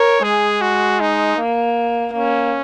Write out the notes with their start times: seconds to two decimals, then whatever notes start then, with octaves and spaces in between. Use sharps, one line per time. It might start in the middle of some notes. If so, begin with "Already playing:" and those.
Already playing: A#4 C#5
0.23 G#3 G#4
0.61 F#4
1.00 D#4
1.38 A#3
2.13 A#3 C#4